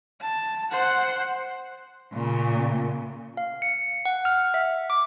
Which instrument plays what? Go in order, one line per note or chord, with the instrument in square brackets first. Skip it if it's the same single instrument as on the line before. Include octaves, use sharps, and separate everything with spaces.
[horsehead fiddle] A5
C5 F#5
[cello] A#2 C#3
[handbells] F5
C#7
F#5
F6
E5
D6